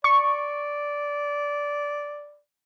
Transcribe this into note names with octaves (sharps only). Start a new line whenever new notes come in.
D5 C#6